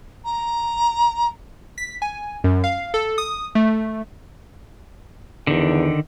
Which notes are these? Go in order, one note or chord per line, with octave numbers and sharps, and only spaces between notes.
A#5
B6
G#5
F#2
F5
A4
D#6
A3
E2 D3 D#3